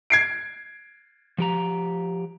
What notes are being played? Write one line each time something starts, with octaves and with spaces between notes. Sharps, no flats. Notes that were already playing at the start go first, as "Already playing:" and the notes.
G#6 C7 D7
F3 G4 A#5